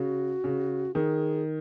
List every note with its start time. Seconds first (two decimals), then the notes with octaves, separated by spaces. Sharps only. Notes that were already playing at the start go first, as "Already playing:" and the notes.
Already playing: C#3 F#4
0.44 C#3
0.94 D#3 G#4